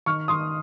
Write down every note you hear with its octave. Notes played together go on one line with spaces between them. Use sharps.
D#3 C#6 F6
D#3 C6 D#6